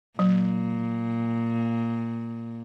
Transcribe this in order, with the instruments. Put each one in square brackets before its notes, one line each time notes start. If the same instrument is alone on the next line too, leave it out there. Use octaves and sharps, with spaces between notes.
[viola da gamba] A#2 [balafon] F#3